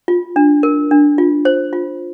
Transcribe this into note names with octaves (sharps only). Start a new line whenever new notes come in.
F4
D4
A#4
D4
F4
C5
F4